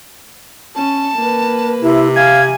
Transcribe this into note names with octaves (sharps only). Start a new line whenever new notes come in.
C#4 A5
A#3 B4
C3 E4
F5 G#5 G#6